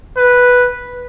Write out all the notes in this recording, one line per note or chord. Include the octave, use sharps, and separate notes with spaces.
B4